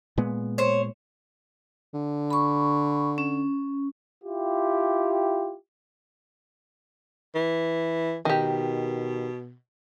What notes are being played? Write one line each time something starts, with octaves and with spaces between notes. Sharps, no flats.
A#2 G#3 B3
C5 C#5
D3
B5 C#6
C#4
E4 F4 G4
E3
B2 D#3 G4